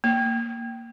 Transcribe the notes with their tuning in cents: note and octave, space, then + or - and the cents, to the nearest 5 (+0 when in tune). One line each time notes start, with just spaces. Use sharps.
A#3 -5